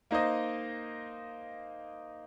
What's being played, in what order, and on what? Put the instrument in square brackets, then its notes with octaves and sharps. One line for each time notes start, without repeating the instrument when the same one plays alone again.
[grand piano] A#3 D#4 C5 D#5